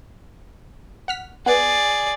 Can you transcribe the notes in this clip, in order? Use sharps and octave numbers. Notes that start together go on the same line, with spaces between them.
F#5 F6 B6
B3 G#4 D5 F#5